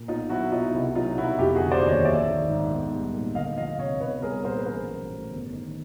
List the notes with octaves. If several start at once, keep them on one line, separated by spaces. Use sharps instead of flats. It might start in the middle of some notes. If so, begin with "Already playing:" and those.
Already playing: A#2
B1 D#4 F4
F#3 E4 F#4
B2 D#4 F4
C2 E4
F#3 D#4 F4
B2 E4 F#4
F1 F4 G4
F#4 G#4
D3
C5 D5
D#2
C#5 D#5
A#1 D5 E5
D#3
G#2
B1
G3
A#2
D2 D#5 F5
F3 D#5 F5
C3 C#5 D#5
B1 B4 C#5
G3 G#4 A#4
A#2 A#4 C5
B4
A1 A#4 C5
F#3
A2
G1
D#3